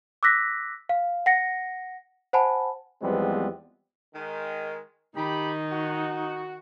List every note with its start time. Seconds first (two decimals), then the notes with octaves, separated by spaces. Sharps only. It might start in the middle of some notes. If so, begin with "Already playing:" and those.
0.23 D6 E6 F#6 A#6 B6
0.89 F5
1.26 F#5 A#6 C#7
2.33 C5 F#5 G#5 A5 B5
3.02 E2 F3 G3 G#3 B3 C4
4.14 D#3 G#3
5.16 D#3 D#4 G4 B5
5.71 F#4